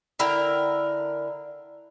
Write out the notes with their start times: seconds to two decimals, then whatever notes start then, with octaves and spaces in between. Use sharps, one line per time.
0.19 D3 E4 A#4 G5